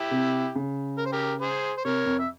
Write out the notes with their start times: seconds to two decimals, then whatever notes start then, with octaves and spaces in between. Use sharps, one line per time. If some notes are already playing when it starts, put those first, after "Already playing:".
Already playing: E4 G4
0.11 C3
0.55 C#3
0.98 A#4
1.05 C5
1.12 G4 A#4
1.41 G#4 C5
1.78 C5
1.85 C3 A#4 C#5
2.06 F2
2.19 E5